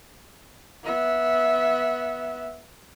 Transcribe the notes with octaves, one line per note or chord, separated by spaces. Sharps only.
B3 E5